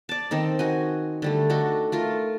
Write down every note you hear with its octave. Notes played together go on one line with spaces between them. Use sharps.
D5 A5
D#3 C4 D#4
D#4 F#4 G#5
D3 G3 A3
D4 D#4 F#4 A4
A3 F4 A#4